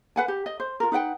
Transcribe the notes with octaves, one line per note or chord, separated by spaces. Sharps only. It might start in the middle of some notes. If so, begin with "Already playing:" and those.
B4 F#5 G#5
G4
D#5
C5
F4 A#4
D#4 B4 F#5 G5